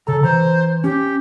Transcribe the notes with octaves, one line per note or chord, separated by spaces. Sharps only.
C#3 A4 A#5
E3 C5 A#5
C#4 G4